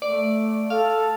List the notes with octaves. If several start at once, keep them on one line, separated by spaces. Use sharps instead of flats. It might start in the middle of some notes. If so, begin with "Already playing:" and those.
A3 D5
A4 F5